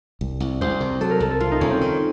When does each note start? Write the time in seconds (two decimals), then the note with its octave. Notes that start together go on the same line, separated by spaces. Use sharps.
0.21 C2
0.40 C2
0.61 C2 C5
0.81 C3
1.01 F#3 A4
1.11 A#4
1.20 C2 A4
1.31 A4
1.40 C2 F4
1.51 D#4
1.60 C2 C#4
1.71 C4
1.81 D#3